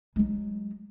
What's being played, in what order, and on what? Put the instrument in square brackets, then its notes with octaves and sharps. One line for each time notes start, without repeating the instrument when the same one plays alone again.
[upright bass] F#3 G#3